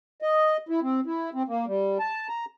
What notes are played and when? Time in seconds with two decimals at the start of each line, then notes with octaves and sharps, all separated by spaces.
0.22 D#5
0.69 E4
0.82 C4
1.06 E4
1.34 C4
1.48 A#3
1.67 G3
1.99 A5
2.28 A#5